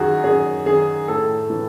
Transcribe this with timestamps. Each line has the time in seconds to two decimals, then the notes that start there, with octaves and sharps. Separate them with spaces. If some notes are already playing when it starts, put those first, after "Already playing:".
Already playing: F#2 D#3 F#4 G#4
0.23 F#2 G#4
0.66 D#3 G#4
1.08 A2 A4
1.50 E3